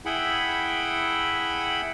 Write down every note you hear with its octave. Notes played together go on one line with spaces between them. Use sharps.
E4 G#4 E5 F#5 G5 B5